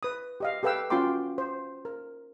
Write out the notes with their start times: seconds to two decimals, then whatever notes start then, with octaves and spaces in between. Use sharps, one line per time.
0.03 B4 D#6
0.40 G4 D#5 F5
0.63 G4 A4 B4 F5 G5 E6
0.90 C#4 F4 F#4 G5 C6 D6
1.38 C5
1.85 A#4